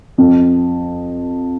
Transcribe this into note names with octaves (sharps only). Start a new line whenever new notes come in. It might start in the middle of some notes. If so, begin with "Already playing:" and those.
F2